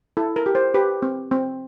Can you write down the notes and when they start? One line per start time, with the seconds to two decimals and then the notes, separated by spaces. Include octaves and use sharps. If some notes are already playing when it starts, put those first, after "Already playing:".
0.17 E4 A4
0.36 A#4
0.46 G4
0.55 C5
0.74 G4 B4
1.02 C4
1.31 C4